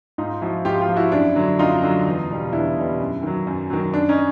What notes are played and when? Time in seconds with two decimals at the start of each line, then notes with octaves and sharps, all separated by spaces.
0.18 G#2 D#4 F4
0.41 F3 E4 F#4
0.65 G#2 F4 G4
0.81 F4 G4
0.89 F3
0.96 E4 F#4
1.12 F#2 D4 E4
1.36 D3 F#3
1.59 F#2 D#4 F4
1.82 D3 F#3
2.06 E2
2.30 B2 G3
2.52 E2 D4 E4
2.76 B2 G3
3.00 F#2
3.23 D#3 F#3
3.47 F#2
3.70 D#3 F#3
3.93 F#2 D4
4.09 C#4 D#4